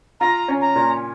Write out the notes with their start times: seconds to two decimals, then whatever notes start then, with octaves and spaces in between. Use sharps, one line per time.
0.20 F4 A#5
0.48 C#4
0.61 A#5
0.76 A#2